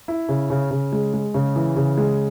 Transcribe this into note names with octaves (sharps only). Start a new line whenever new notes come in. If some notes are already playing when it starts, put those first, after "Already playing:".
E4
C#3
C#3
C#3
G#3
G#3
C#3
E3
C#3
G#3